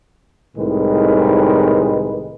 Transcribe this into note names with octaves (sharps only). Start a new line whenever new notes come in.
C2 A2 D#3 G#3 B4